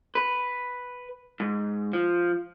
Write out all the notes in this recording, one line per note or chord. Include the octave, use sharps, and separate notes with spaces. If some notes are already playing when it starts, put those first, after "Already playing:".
B4
G#2
F3